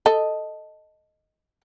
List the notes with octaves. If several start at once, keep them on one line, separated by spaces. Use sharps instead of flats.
A4 D#5